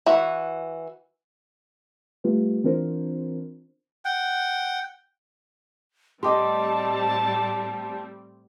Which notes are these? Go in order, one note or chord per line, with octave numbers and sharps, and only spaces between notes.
E3 F#4
G3 A3 F4 G4 B4
E3 C4 D4 F4 A#4 C5
F#5 G5
A2 G3 C4 G4 D#5 A5 C6 D6